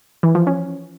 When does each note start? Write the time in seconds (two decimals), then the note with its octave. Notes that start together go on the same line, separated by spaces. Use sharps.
0.23 E3
0.35 F3
0.47 C#4